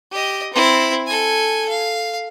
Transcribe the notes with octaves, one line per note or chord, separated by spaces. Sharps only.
G4 D#5
C4 E4
A4 G#5
F5